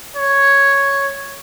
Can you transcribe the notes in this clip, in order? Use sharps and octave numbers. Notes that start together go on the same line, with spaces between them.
C#5